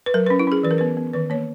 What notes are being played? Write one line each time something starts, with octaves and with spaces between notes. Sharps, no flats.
B4
F#3 A#4
C#4 B4
E4
C#4 G#4
E3 B4
A#4
B3 B4
B3
D#3 B4
A#3 C#5